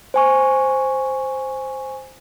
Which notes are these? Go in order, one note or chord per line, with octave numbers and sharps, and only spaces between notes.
C5 G#5 C#6